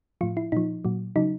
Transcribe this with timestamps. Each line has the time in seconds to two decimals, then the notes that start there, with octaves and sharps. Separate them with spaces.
0.21 A2 F3 F4
0.37 E4
0.52 A#2 F3 D#4
0.85 A#2 F#3
1.16 C#3 F#3 D#4